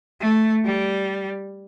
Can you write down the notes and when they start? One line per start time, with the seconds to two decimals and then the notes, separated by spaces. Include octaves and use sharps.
0.20 A3
0.64 G3